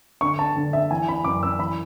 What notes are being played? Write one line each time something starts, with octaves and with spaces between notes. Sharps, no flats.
D3 C#6
A5
D3
E5
E3 G#5
B5
F#2 D6
E6
E3 B5